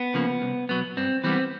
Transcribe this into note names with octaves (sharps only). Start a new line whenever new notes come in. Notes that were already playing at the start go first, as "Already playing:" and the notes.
Already playing: B3
C#3 F3 A#3
C2
B2 F#3 B3
G2 C4
E3 G3 B3 C4